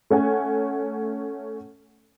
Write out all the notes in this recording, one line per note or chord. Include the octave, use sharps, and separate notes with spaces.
A3 C#4 F#5 G#5